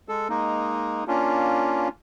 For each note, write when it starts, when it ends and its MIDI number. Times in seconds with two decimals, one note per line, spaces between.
0.09 0.28 56
0.09 0.28 69
0.29 1.04 56
0.29 1.04 58
0.29 1.04 63
1.08 1.88 58
1.08 1.88 61
1.08 1.88 62
1.08 1.88 65